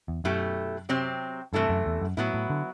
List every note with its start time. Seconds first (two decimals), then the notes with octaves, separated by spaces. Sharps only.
0.08 E2
0.24 F#2 B2 A3 E4 G4
0.89 C3 F#3 C4 G4
1.53 G2 C3 E3 A3 E4 A4
1.69 F#2
1.86 E2
2.02 F#2
2.17 A2 F#3 B3 E4
2.34 A2
2.50 D3